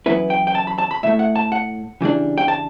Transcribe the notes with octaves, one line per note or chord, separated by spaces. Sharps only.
F#2 E3 B3 E4 B4
G5
G5
A5
B5
A5
B5
A2 E3 A3 E5
F#5
A5
F#5
C#3 E3 G3 D4
G5
A5